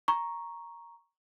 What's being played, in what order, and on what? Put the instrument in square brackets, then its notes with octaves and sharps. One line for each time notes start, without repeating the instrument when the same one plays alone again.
[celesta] A#5 C#6